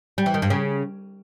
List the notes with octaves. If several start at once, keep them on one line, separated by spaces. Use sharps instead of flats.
G3
E3
D#3
G2
C#3